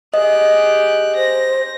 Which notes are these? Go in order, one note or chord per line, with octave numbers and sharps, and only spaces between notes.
G4 G#4 D#5 F#6
C5 A#6